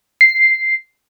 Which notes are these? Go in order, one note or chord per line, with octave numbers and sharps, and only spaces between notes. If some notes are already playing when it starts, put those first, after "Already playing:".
C7